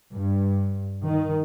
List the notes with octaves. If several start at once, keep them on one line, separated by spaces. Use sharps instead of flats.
G2
D#3